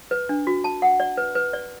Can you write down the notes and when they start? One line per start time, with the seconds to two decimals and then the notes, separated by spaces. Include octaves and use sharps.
0.11 B4
0.29 D4
0.47 F#4
0.64 A5
0.82 F#5
1.00 D5
1.17 B4
1.35 B4
1.53 D5